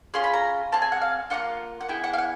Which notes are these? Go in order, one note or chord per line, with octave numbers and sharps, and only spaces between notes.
C#4 F4 G#4 C6
B5
A#5
C4 F4 G#4 A5
G#5
F#5
F5
A#3 D4 F4 F#5
F#5
B3 E4 G#4 G5
F#5
F5
F#5